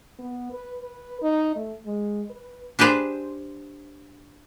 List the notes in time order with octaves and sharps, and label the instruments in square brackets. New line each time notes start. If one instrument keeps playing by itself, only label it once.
[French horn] B3
B4
B4
D#4
A3
G#3
B4
[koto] D4 G4 G#4 B4 C5